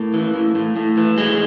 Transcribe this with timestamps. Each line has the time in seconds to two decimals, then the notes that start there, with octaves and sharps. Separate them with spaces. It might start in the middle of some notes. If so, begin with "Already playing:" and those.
Already playing: A2 A#3
0.14 E3
0.35 A2
0.55 A2
0.76 A2
0.97 E3
1.18 A2 G#3